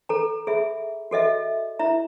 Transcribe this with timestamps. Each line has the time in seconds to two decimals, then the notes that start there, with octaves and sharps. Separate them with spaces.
0.09 A4 A#5
0.47 G#4 E5 B5
1.11 F#4 A4 D#5 E5
1.79 E4 E5 A#5